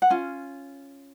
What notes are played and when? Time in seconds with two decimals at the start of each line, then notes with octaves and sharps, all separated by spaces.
0.02 F#5
0.10 C#4 F4